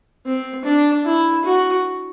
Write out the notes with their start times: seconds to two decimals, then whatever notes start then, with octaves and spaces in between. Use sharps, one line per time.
0.26 C4
0.65 D4
1.06 E4
1.45 F#4